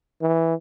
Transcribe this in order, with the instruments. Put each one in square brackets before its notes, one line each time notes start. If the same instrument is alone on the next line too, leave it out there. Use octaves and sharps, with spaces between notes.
[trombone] E3